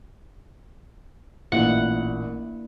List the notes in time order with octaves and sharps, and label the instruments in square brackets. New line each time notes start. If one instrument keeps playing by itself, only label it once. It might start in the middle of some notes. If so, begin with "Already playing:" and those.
[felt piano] A1 A#2 [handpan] A#3 D4 E4 [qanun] F#5